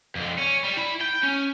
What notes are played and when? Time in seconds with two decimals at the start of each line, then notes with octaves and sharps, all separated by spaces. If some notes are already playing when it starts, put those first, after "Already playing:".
0.16 F2 D3
0.39 C#4
0.64 G3
0.77 E4 B5
1.01 G5
1.23 C#4